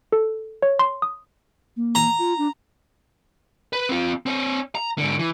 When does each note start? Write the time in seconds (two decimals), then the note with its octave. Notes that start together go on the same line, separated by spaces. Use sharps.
0.12 A4
0.62 C#5
0.79 C6
1.02 D#6
1.76 A#3
1.95 A#5
2.18 F4
2.38 D4
3.73 B4
3.89 C4 F4
4.26 C4 C#5
4.75 A#5
4.98 G#2 D3
5.19 E3